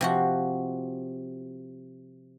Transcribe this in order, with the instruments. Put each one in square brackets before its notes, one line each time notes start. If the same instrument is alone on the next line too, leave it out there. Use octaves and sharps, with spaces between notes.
[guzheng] C3 F3 F#4